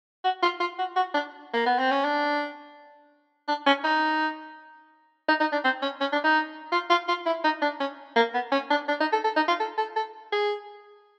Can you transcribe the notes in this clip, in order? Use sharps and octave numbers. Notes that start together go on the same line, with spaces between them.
F#4
F4
F4
F#4
F#4
D4
A#3
B3
C4
C#4
D4
D4
C#4
D#4
D#4
D#4
D4
C4
C#4
C#4
D4
D#4
F4
F4
F4
E4
D#4
D4
C#4
A#3
B3
C#4
D4
D4
D#4
A4
A4
D#4
F4
A4
A4
A4
G#4